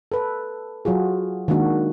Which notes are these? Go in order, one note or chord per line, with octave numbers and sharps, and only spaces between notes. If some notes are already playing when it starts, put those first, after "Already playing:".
A4 B4
F#3 F4 F#4 G#4
D#3 G#3 A#3 D4 F#4